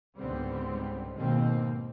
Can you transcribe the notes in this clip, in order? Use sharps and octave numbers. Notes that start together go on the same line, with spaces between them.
C#2 G#2 D3 G3 B3 C4
D#2 G#2 B2 D#3 A#3 C4